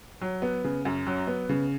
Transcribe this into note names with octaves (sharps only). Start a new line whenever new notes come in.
F#3
B3
C#3
F#2
F#3
B3
C#3